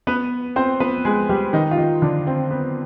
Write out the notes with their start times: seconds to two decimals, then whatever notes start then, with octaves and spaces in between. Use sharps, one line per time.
0.07 B3 B4
0.56 C4 C5
0.80 B3 B4
1.05 G#3 G#4
1.29 G3 G4
1.53 D#3 D#4
1.71 F4
1.78 D#3 D#4
2.02 D3 D4
2.27 C4
2.51 B3